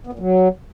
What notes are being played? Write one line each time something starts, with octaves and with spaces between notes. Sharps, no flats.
B3
A#2
F#3